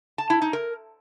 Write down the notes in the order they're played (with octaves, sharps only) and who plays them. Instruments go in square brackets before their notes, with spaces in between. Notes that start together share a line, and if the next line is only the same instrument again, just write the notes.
[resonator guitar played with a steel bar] A5
E4
D#4
A#4